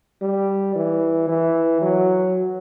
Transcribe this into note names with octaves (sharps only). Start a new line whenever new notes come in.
G3
E3
E3
F#3